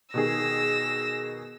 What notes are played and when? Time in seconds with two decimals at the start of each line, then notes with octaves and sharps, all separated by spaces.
0.14 B2 D#3 G#4 E6 A#6